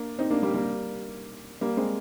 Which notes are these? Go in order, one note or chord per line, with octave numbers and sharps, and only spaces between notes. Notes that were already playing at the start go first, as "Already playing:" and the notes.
Already playing: A#3 D4
C4 D#4
A#3 D4
G3 A#3
G3 A#3
G3 A#3
G#3 C4